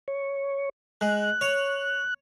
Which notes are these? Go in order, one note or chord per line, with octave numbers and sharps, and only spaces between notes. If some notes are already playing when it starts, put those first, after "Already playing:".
C#5
G#3 F#6
C#5